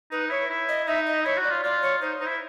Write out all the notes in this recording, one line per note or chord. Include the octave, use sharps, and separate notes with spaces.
D#4 B4
E4 C#5
E4
D#5
D#4 E5
D#5
E4 C#5
F#4
D5
F4
F4 D5
C#5
D#4 C5
D#4 C5
E4